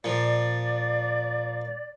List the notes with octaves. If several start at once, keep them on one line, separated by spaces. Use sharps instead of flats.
A#2 F3 D5